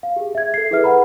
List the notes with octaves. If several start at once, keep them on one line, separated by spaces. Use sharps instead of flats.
F5
G4 G#4
E5 G#6
A4 C7
E4 G#4 A4 B4 E5 F6
B4 F#5 A#5 B5